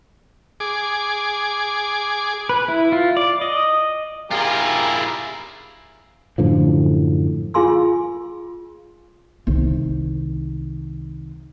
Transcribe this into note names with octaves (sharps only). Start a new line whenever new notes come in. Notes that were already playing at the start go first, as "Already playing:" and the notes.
G#4 D6
B4
E4
F4
D5
D#5
G3 E4 F4 G#4 A#4
F#2 A2 D3 F3
F4 G#4 F5 G#5 C6 E6
C2 D#3